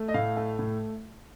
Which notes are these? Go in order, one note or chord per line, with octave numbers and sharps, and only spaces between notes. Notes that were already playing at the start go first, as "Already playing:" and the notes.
Already playing: A3
D#5
A2 F5
A3
A2